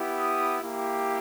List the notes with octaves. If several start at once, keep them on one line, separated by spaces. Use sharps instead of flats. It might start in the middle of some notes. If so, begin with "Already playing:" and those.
Already playing: B3 E4 G4
D#6
A#3 E4 G4